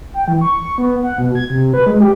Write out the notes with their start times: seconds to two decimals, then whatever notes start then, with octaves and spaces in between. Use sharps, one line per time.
0.14 G5
0.28 E3
0.41 C#6
0.78 B3
1.03 F#5
1.18 B2
1.35 G#6
1.50 C3
1.74 B4
1.86 G#3
2.00 G4